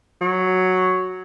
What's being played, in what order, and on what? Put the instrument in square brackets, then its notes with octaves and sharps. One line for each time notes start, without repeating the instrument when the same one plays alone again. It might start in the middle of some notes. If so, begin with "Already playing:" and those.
[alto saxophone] F#3